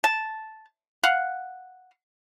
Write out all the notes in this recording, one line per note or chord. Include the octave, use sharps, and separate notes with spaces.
A5
F5 F#5